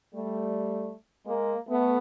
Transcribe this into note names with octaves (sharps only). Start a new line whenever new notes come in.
G3 A3
G#3 A#3
A3 B3